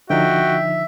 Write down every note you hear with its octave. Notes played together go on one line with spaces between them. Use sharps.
D3 F3 D#4 F#4 E5 G5